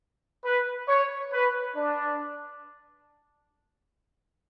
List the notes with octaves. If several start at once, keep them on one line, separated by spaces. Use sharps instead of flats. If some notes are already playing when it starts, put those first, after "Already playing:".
B4
C#5
B4
D4